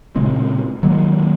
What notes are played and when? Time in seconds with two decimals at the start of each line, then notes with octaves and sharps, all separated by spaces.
0.16 A#2 C#3 G#3 C4
0.83 D#3 F#3 G#3 A#3